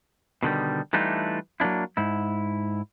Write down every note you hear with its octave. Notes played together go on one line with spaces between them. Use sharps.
B2 D3 D#3 G3
E3 G3 A3 D4 D#4 F4
F#3 A#3 B3 D4 E4
G#2 E4